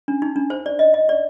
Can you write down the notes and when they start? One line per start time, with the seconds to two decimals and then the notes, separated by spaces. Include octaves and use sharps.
0.08 D4
0.22 D#4
0.36 D4
0.50 C5
0.66 D5
0.79 D#5
0.94 D#5
1.09 D5